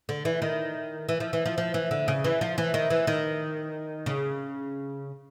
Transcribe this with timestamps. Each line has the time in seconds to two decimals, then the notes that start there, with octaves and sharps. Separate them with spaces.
0.09 D3
0.25 E3
0.42 D#3
1.09 E3
1.20 F3
1.33 E3
1.46 F3
1.58 F3
1.74 E3
1.91 D3
2.08 C#3
2.24 E3
2.41 F3
2.58 E3
2.74 D#3
2.90 E3
3.07 D#3
4.06 C#3